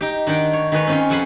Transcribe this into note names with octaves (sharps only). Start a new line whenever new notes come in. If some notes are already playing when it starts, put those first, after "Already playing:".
D#4 G4
D#3 D4 F#5 G5
C#5
D#3 G#4 B4 C#5
C4 C#4 F4
F2 F#5 G#5 A5 B5 C6